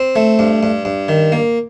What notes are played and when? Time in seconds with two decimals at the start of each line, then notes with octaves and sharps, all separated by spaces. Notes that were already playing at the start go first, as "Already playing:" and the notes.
Already playing: C4
0.16 A3
0.39 G2
0.63 G2
0.85 G2
1.09 D#3
1.32 A#3